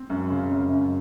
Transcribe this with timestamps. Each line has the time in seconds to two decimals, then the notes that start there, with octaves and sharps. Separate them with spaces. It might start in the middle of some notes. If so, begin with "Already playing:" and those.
Already playing: C4
0.10 F#2
0.30 C#3
0.51 F#2
0.72 F#2